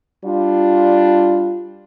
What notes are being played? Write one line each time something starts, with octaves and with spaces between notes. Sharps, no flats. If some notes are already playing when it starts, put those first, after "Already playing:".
G3 D4 F4